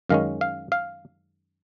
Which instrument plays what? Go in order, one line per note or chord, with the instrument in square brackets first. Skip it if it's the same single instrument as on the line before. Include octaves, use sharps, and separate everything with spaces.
[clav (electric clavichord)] F#2 D#3 G#3 C#4 F5
F5
F5